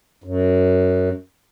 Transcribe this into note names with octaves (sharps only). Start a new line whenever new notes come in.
F#2